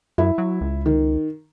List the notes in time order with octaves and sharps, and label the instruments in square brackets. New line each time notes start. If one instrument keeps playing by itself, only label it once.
[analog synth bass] F#2 [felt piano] E4
[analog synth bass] F#3
C#2
[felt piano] D#3